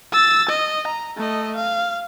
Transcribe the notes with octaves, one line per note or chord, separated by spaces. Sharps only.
E6 A6
D#5
A#5
A3 D#5
F5